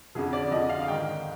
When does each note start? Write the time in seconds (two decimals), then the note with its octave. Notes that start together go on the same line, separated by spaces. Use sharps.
0.15 F2 D3 F3 G#4
0.33 D5
0.51 F2 D3 F3 D#5
0.69 F5
0.88 G#2 D#3 G5